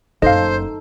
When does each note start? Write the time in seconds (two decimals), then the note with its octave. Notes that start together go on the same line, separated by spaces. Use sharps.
0.22 F#1 D#4 A4 C5 D#5 F5